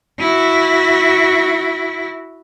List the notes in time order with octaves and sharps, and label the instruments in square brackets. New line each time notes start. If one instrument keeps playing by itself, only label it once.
[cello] E4 F#4